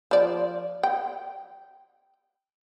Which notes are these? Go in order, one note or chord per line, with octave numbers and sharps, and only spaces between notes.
F3 D5
G5